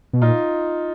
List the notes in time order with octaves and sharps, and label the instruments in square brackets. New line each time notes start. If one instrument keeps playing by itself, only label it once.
[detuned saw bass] B2
[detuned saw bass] A#2 [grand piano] D#4 F4